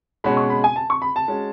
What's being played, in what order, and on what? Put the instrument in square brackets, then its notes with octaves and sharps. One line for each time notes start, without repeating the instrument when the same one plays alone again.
[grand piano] B2 G#3 C#4 F#4 [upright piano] B5
[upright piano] C#6
B5
G#5
A5
C#6
B5
A5
[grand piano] G#3 C#4 F#4